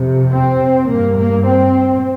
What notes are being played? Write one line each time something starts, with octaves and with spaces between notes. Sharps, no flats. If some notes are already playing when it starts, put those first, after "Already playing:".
Already playing: F2 C3
C4
G2 A#3
A#3
C4